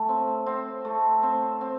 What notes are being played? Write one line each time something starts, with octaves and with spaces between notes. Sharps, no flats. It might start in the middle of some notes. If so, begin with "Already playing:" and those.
Already playing: A3
C4
C4
A3
C4
C4